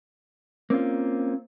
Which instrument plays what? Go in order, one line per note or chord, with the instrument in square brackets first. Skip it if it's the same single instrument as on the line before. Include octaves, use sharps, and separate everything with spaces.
[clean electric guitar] A#3 C4 C#4 F4